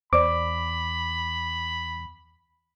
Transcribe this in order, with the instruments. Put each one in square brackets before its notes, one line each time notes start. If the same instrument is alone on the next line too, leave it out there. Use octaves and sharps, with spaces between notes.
[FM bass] E2 [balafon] C5 D5 [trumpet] B5 [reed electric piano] D6